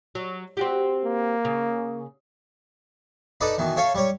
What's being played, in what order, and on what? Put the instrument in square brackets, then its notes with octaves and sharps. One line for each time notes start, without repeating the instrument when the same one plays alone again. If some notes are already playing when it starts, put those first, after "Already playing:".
[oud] F#3
C4 F#4 G4
[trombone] A#3
[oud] C#3
[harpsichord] D#4 A4 B4 D5 D#5
B2 D#3 E3
A4 C#5 E5 F5
G3 C#5